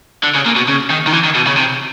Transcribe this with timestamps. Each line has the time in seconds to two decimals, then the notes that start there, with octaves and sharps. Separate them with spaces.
0.23 D3
0.35 C#3
0.46 A#2
0.56 B2
0.68 C#3
0.90 D#3
1.07 D#3
1.13 E3
1.24 D#3
1.35 B2
1.47 C#3
1.57 C3